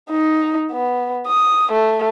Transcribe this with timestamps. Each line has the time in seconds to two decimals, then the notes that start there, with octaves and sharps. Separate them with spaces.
0.10 D#4
0.72 B3
1.27 D#6
1.72 A3